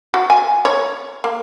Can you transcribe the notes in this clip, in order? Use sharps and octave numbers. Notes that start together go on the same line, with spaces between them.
F#4
G#5
C#5
A#3